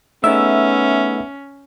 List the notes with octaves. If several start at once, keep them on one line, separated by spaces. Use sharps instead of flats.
A3 B3 C#4 D#4 G#4 E5